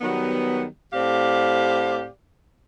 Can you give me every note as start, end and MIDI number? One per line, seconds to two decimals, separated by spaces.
0.01 0.64 51
0.01 0.64 54
0.01 0.64 55
0.01 0.64 59
0.93 2.06 45
0.93 2.06 60
0.93 2.06 67
0.93 2.06 74
0.93 2.06 77